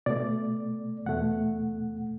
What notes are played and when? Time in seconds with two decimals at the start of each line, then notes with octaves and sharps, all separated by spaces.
0.06 B2 A3 D5
1.06 E2 B2 A3 F#5